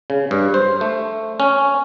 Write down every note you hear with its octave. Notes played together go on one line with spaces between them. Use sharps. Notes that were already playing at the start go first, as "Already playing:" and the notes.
C#3
G2
C5
A3
C#4